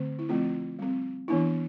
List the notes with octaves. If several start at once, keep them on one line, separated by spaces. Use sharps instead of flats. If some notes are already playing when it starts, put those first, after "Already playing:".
Already playing: D3 A3 C4
E4
F3 A3 C4 F4
G3 C4
E3 B3 D4 E4